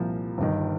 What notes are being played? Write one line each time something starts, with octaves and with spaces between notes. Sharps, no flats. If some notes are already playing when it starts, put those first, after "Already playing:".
Already playing: C2 A#2 F3
G1 G2 D#3